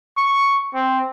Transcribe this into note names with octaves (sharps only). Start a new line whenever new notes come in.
C#6
C4